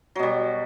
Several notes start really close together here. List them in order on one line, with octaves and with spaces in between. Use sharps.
F#3 B2 G3